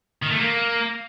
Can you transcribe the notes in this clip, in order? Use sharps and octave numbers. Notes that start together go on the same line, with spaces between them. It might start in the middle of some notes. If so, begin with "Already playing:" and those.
D#3
A3
A#3